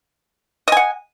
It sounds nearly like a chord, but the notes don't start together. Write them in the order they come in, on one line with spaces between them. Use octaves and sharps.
D#5 G#5 F#5